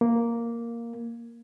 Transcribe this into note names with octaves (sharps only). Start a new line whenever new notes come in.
A#3